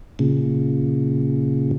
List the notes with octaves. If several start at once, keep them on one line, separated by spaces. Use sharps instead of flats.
A#2 C#3